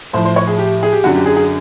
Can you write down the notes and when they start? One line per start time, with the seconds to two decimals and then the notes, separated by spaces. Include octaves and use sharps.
0.13 A2 F3 C5
0.25 C5
0.36 C#5
0.48 G#4
0.58 G4
0.83 G#4
0.93 G4
1.03 F#2 D3 F#3 F#4
1.15 G4
1.26 G#4
1.37 G#4